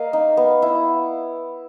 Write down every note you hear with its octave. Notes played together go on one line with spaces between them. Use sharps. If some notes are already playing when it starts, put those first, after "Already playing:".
Already playing: A#3 D#5 F5
D#4
B3
E4